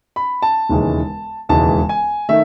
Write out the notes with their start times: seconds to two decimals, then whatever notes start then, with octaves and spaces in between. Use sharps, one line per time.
0.16 B5
0.42 A5
0.69 E1 D#2 C#3 E3 G#3
1.49 E1 D#2 C#3 E3 G#3 A5
1.89 G#5
2.29 D#3 A3 E5